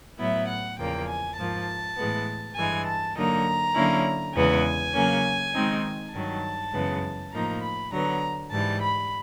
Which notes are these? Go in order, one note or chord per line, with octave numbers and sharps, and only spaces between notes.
A2 F#3 B3 E4 E5
F#5
E2 C#3 F3 A#3 G5
G#5
G#2 F3 A#3 A5
A2 E3 G#3 B3
G2 E3 G#3 G#5
A5
D3 F#3 A#3 D#4 A#5
D3 F#3 A#3 C#4 E4
E2 C#3 E3 G#3 B3 G#5
C#3 F#3 A#3 C#4
D#3 G#3 C4 D#4
G2 D#3 F#3 A5
F#2 C#3 E3 G#3 B3
A2 F3 A#3 D#4 A#5
B5
D3 F#3 B3 A#5
G#2 E3 G3 A5
B5